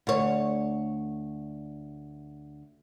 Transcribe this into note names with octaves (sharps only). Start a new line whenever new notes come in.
D2 C#5